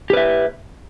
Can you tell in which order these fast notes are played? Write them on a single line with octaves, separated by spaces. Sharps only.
G4 B4 E5